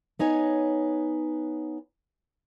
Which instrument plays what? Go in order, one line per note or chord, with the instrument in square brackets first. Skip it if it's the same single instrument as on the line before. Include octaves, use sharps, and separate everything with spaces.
[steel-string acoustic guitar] B3 D#4 C#5 G#5